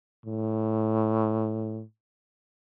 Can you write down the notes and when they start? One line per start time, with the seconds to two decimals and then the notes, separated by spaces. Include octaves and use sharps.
0.26 A2